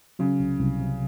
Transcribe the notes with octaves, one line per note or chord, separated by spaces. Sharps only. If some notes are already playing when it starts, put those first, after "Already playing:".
C#3 F#3
C2
C2
C3